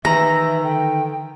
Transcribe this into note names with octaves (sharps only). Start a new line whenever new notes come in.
D#3 E3 E5 A#5
D3 G5